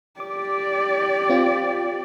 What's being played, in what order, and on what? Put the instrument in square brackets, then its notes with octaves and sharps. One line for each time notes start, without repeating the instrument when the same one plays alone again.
[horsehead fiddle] G4 D5 [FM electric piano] D6
[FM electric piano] C4 F4